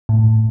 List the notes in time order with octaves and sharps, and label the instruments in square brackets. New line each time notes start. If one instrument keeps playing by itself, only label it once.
[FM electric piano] A2